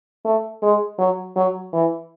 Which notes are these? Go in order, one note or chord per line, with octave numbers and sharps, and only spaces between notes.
A3
G#3
F#3
F#3
E3